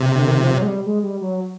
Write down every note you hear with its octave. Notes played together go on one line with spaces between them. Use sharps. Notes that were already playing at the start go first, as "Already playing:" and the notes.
Already playing: C3
D3
D#3
F3
F#3
G#3
G3
G#3
G3
F#3